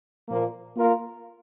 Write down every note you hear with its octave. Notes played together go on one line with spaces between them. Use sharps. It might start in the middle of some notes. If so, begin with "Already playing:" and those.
A#2 F3 A#3
A#3 F4 A#4 F5